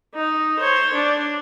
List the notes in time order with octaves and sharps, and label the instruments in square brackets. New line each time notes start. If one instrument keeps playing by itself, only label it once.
[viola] D#4
C5 C#5
D4